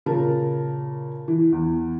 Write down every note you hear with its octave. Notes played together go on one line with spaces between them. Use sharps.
A#2 C#3 A#4 A5
E3
E2